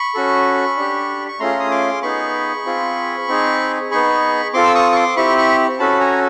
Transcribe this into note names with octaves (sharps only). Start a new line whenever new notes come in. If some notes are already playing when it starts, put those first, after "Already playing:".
Already playing: B5 C#6
C#4 F#4 A4
D4 G4
C#6
A3 C#4 F4 G#4 A#5 C6
D#6
C6 D6
B3 D#4 G#4 B5 C#6
C4 F4 G#4
C4 D#4 G#4
B3 D#4 G#4 B5 C#6
C4 F4 A4 C6 D6
E6
C#6 D#6
C#6
C6 D6
C4 E4 G4 B5 C#6
B5 C#6
C#4 F#4 A4 A5 B5
G#5 A#5